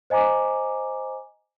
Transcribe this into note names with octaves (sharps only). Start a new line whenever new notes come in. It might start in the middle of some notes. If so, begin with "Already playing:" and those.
C5 D#5 G#5 A#5 D6